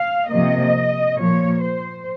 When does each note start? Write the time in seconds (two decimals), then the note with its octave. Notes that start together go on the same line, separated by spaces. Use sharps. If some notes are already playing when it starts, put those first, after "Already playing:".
Already playing: F5
0.29 C3 F3 A#3 D#5
1.17 A#2 F3 A#3 C#5
1.62 C5